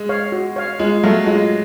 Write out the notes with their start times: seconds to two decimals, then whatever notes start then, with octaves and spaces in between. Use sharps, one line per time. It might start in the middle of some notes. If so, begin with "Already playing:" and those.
Already playing: G#3
0.09 C#5 F5
0.32 F#4
0.56 C#5 F5
0.79 G#3 F4
1.03 F#3 A3 A4 F5
1.26 G#3 F4